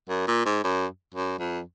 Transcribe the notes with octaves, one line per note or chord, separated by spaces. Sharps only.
F#2
A#2
G#2
F#2
F#2
F2